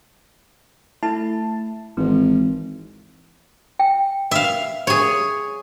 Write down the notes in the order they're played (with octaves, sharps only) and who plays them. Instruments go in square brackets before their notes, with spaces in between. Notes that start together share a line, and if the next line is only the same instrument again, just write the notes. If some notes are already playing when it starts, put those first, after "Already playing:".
[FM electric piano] A3 E4 A5
[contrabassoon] G#1 [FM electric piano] E3
[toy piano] G5
[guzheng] E5 F5
G#4 C#5